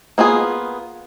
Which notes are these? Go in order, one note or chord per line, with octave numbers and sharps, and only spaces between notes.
A#3 B3 F4 G#4